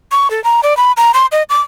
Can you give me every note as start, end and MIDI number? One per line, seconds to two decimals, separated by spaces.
0.12 0.30 85
0.30 0.42 69
0.44 0.61 82
0.63 0.76 74
0.77 0.92 83
0.97 1.11 82
1.14 1.26 84
1.32 1.43 75
1.49 1.61 86